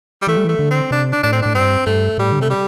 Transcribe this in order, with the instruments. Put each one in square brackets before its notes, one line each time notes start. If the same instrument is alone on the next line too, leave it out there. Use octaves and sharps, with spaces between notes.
[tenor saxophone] G3
[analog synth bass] E3 [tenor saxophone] A3
[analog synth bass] G3
[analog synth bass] E3 [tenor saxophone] A3
[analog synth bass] D3
[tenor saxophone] C4
[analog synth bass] C3 [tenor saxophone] D4
[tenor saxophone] D4
[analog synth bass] A2 [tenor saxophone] D4
[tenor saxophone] C4
[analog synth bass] A2 [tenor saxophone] D4
[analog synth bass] G2 [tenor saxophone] C4
[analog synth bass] G2 [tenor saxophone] A3
[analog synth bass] A2 [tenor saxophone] G3
[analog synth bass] D3
[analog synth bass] C3 [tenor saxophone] A3
[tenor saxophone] G3